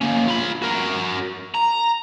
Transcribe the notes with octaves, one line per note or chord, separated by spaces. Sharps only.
A#3 C#4
F4 B5
F#4 A#4
A#5